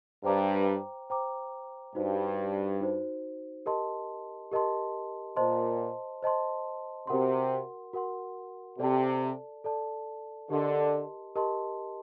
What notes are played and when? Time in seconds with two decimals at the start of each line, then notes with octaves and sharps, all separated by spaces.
0.24 G2 C5 G5 A#5 D6
1.10 C5 G5 A#5 D6
1.95 G2 D#4 F#4 C5
2.81 D#4 F#4 C5
3.66 G4 A#4 D#5 A5 C6
4.52 G4 A#4 D#5 A5 C6
5.36 A#2 C5 D#5 A5 C6
6.23 C5 D#5 A5 C6
7.07 C3 F#4 A#4 F#5 C6
7.93 F#4 A#4 F#5 C6
8.78 C3 A4 D5 A5
9.64 A4 D5 A5
10.50 D3 G4 A#4 D#5 A5 C6
11.36 G4 A#4 D#5 A5 C6